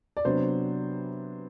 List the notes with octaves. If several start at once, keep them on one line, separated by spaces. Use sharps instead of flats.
D5
C3 F#3 B3 D4 C5